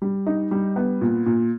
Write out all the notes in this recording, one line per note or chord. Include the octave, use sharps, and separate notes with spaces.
G3
D#4
G3
B3
A#2
A#2